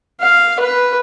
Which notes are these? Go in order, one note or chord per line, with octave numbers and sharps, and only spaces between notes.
F5
B4